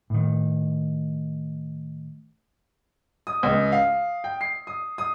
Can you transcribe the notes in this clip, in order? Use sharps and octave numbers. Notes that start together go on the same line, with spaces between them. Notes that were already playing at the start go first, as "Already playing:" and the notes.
A2 D#3
D#6
C#2
F5
G5
C7
D#6
D#6